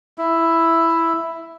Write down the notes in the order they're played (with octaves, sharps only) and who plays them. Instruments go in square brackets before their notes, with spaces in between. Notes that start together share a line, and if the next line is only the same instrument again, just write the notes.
[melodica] E4